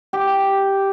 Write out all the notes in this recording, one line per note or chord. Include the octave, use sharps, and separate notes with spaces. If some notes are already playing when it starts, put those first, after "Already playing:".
G4